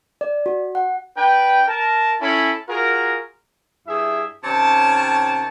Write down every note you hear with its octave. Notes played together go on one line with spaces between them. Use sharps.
D5
F#4
F#5
D4 B4 G5
A#4 A5
C#4 E4 A4 G#5 B5
F4 F#4 G#4 A#4
G2 E4 G#4 E5
C3 D#3 C#4 C#5 A5